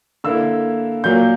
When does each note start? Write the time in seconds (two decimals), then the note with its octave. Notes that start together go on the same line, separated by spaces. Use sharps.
0.24 D3 A#3 E4 E6
1.04 A#2 F#3 A#3 G6